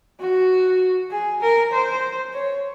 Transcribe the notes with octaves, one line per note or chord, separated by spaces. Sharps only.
F#4
G#4
A#4
C5
C#5